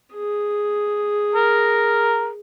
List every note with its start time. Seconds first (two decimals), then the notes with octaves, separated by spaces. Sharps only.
0.14 G#4
1.35 A#4